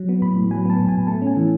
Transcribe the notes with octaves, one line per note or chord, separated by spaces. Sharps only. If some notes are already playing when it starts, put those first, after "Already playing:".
Already playing: F#3
B3
A2 B5
A2
F#3 G#5
B3 A5
A2
G#5
A2
A3 A5
C#4
G#5
E3